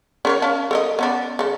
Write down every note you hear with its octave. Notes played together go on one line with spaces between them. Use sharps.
C#4 A#4 C#5
C#4 F5 A5
A4 A#4 D#5
B3 C#4 D4
C#3 A4